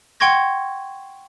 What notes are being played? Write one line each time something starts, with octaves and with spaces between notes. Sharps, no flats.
F#5 G5 C6 C#6 G#6 A#6